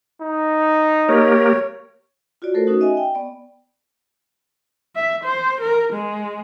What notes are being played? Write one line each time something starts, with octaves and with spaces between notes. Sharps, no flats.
D#4
A#3 G4 A#4 C#5
F4 F#4 C#5 D5
A3 A4 A#4 C5
C#4 D#4 F#4
D#5 E5 G#5
G5
B3 D5
E5
C5
A#4
G#3